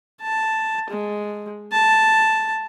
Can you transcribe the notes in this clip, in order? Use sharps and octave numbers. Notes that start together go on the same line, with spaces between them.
A5
G#3
A5